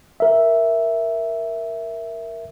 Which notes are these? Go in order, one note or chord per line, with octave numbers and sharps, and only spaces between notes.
A#4 E5